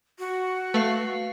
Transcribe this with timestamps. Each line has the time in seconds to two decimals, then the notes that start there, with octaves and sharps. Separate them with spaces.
0.19 F#4
0.74 A3 B4 F5 C7